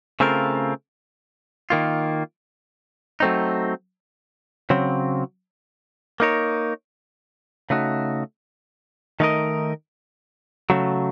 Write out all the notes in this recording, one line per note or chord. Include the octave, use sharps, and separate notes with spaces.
C#3 A3 C4 F4 A#4
D#3 A#3 F4
F#3 A3 C4 D#4
C#3 F#3 C4
A#3 D#4 A#4 C#5
C#3 A3 D#4 F#4
D#3 A3 D#4 A#4 D#5
C#3 F#3 A3